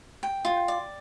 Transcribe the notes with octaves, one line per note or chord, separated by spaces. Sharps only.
G5
F4
D5